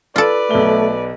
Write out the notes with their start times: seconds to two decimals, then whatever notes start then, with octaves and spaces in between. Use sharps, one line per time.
0.16 F4 A4 B4 D5
0.51 B1 A3 G7